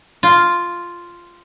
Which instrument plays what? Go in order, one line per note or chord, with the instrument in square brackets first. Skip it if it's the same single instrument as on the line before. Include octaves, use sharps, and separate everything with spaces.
[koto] F4